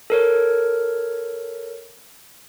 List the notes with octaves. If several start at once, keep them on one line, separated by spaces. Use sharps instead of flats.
A4 A#4 C#5